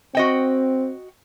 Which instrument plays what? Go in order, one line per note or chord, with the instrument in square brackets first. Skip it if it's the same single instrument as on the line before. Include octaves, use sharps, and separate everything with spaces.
[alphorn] C4 [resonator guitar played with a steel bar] F#4 D#5 G5